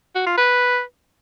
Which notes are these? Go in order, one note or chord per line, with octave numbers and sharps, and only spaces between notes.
F#4
F4
B4